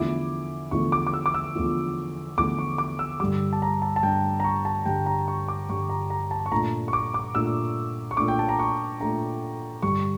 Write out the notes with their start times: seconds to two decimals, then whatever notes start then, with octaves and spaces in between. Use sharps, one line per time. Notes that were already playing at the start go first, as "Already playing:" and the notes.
Already playing: E2 D3 F3 A3 E4 D6
0.71 E2 D3 F3 A3 E4 C#6
0.92 D6
1.07 D6
1.13 E6
1.26 D6
1.34 E6
1.55 E2 D3 F3 A3 E4
2.37 E2 D3 F3 A3 E4 D6
2.59 C#6
2.78 D6
2.99 E6
3.20 G2 D3 G3 D6
3.53 A5
3.62 A#5
3.82 A5
3.96 A5
4.03 G2 D3 G3 G5
4.40 A#5
4.44 C#6
4.65 A5
4.86 G2 D3 G3 G5
5.06 A#5
5.28 C#6
5.48 D6
5.69 G2 D3 G3 C#6
5.90 A#5
6.10 A#5
6.31 A5
6.46 C#6
6.52 A#2 A3 D4 A#5
6.88 C#6
6.93 D6
7.14 D6
7.35 A#2 A3 D4 E6
8.11 C#6
8.17 A#2 A3 D4 D6
8.28 G5
8.39 A5
8.49 A#5
8.59 C#6
9.00 A#2 A3 D4 A#5
9.83 G2 D3 G3 C#6